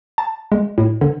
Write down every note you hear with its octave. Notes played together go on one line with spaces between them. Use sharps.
A5
G#3
A2
D3